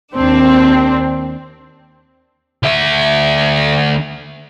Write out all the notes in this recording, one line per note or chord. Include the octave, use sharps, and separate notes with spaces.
D#2 C4 D4
D2 E5